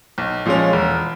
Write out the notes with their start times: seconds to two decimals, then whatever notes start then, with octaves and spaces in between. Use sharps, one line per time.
0.18 B1
0.46 A#2 F3 G#3 C#4
0.73 E1